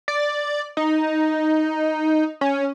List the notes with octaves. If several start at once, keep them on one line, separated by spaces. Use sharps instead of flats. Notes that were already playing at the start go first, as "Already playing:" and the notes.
D5
D#4
C#4